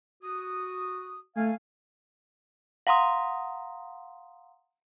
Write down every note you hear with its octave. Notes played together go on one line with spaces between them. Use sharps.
F#4 D#6
A3 F5 G#5
F5 F#5 A#5 C6 D#6